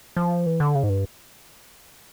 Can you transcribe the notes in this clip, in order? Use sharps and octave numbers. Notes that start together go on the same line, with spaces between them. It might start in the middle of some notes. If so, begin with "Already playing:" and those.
F3
E3
D3
C#3
G#2
G2